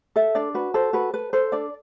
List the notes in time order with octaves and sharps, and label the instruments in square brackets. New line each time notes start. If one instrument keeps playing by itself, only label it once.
[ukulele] A4 E5
D4 D5
F#4 B4
A4 C5
F#4 B4
A4 B4
A4 C5
D4 D5